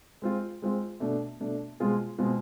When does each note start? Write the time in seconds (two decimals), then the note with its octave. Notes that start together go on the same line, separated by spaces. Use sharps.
0.22 G#3 C4 F4
0.62 G#3 C4 F4
1.00 B2 A3 D4
1.40 B2 A3 D4
1.80 B2 G#3 C4 F4 G#4
2.18 B2 G#3 C4 F4 G#4